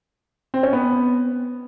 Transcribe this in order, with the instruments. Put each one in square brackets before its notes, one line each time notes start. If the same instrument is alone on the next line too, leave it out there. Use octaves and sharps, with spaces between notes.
[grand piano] C4
C#4
B3